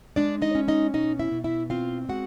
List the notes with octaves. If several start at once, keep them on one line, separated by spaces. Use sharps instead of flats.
G#3 D4 D5
D#4 D#5
C#4
D#4 D#5
B2 D#4 D#5
E4 E5
B2
E4 E5
C4 F4 F5
G#3 F#4 F#5